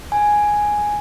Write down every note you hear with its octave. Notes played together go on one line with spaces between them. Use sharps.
G#5